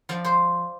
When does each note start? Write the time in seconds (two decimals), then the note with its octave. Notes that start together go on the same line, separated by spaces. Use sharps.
0.09 F3 D5
0.24 C5